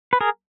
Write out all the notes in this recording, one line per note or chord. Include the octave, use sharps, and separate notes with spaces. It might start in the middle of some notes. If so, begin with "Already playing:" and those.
B4
G#4 A#4